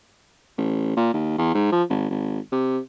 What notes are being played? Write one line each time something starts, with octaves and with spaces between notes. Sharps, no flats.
A1
A#2
D#2
E2
G#2
F3
G#1
G#1
C3